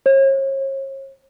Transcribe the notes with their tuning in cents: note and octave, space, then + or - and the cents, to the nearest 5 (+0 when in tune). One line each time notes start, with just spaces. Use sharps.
C#5 -40